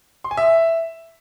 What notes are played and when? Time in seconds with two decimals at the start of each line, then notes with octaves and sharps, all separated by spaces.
0.24 C6
0.31 G#5
0.37 E5